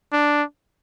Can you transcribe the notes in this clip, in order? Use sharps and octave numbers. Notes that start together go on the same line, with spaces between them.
D4